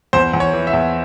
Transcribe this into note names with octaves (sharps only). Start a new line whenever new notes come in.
E2 C5
E2
C#5
E3
E5
E2